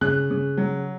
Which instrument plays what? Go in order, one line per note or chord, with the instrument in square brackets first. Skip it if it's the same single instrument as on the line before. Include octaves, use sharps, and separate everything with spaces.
[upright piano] C#3 F#6
C#3
F#3